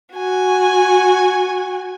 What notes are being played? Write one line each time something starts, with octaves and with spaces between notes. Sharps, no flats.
F#4 G#5